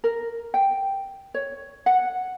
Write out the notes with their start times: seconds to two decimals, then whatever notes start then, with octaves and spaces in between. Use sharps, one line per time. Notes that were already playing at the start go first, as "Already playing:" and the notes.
0.04 A#4
0.54 G5
1.34 C#5
1.86 F#5